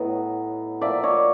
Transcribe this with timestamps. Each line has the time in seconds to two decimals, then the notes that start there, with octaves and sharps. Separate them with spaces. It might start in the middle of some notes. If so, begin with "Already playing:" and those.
Already playing: A2 F#3 B3 D#5
0.81 A#2 F3 A#3 D5 E5
1.03 C#5 D#5